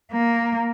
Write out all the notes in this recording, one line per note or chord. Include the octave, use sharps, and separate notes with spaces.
A#3